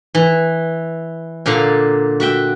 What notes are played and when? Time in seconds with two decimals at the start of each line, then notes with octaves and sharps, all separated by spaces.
0.15 E3
1.46 A#2 D3 A4 D5 F5 A#5
2.20 F#4 E5 G5